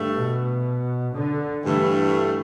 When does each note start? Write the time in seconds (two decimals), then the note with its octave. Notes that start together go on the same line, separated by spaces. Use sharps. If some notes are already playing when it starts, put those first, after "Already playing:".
Already playing: G2 D3 A3
0.15 B2
1.15 D3
1.66 G2 D3 E3 A3